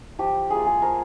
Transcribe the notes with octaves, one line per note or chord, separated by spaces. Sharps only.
F3 G4
A#3 F4 G#4
G#4
F3 A#4